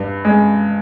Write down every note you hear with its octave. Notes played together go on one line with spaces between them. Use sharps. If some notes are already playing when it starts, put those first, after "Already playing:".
Already playing: G2
G#3